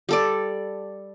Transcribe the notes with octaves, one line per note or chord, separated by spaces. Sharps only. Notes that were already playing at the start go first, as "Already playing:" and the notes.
G3 A4 D5